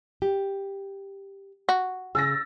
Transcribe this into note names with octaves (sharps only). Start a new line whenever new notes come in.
G4
F#4
C#3 G#4 E6 A6 A#6